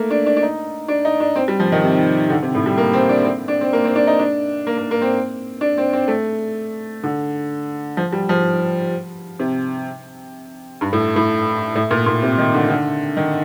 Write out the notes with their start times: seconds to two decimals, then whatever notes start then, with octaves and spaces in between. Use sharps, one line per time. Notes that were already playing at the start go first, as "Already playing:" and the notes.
Already playing: A3 A#3
0.10 D4
0.26 D4
0.37 D4
0.42 D#4
0.88 D4
1.05 D#4
1.20 D4
1.36 C4
1.48 G3
1.60 F3
1.72 D#3
1.84 C3
2.30 D3
2.43 C3
2.55 A2
2.66 G3
2.77 A#3
2.93 C4
3.09 D4
3.24 C4
3.48 D4
3.61 C4
3.73 A#3
3.85 C4
3.96 D4
4.07 D#4
4.19 D4
4.67 A#3
4.78 A#3
4.91 A#3
5.02 C4
5.61 D4
5.78 C4
5.93 C4
6.08 A3
7.04 D3
7.97 F3
8.13 G3
8.29 F3
9.39 C3
10.81 G2
10.93 A2
11.16 A2
11.75 A2
11.91 A#2
12.06 A#2
12.23 C3
12.38 D#3
12.54 D3
12.70 D3
13.17 D#3